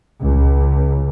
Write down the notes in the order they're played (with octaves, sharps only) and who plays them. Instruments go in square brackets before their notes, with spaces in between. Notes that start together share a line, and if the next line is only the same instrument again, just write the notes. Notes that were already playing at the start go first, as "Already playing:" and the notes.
[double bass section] C#2